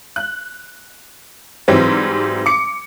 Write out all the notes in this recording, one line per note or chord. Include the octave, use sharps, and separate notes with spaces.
F#6
G#2 E3 F#3 G3 C4
D6 C#7